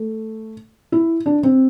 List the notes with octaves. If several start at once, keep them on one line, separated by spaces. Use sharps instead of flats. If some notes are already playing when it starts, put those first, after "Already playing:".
Already playing: A3
E4
D4
C4